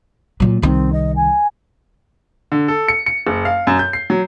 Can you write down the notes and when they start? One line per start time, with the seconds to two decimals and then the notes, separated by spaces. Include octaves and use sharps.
0.40 A#2 F#3
0.62 C2 D#3 C4
0.93 D#5
1.16 G#5
2.52 D3
2.68 A4
2.88 C#7
3.06 C#7
3.27 F#1
3.45 F5
3.67 F#2
3.79 G6
3.93 C7
4.10 F#3